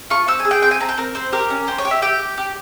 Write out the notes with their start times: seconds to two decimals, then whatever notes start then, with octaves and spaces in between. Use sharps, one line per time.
0.10 F4 C#6
0.28 C4 E6
0.40 G#5
0.45 G#4
0.51 G5
0.62 C4 G5
0.71 G#5
0.80 C4 A#5
0.89 G5
0.97 C4 A#4
1.15 C4 C5
1.32 G4 A#4
1.50 C#4
1.67 G4 C5
1.78 C#5
1.85 G4
1.91 E5
2.02 G4 G5
2.19 G4
2.38 G4